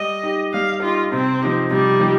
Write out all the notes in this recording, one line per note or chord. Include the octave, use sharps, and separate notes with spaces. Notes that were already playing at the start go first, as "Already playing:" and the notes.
Already playing: G3 D#5
D#4 G4
G3 F5
D#4 F4 G4
C3 C4
F3 D#4 G4
C3 G3
F3 D#4 G4